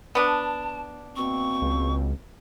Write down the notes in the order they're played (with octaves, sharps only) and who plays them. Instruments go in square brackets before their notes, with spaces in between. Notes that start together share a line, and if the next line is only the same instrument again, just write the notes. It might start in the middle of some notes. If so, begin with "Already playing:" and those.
[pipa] B3 D4 [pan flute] A5
[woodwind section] B2 A#3 C4 [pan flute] C#6
[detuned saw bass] C#2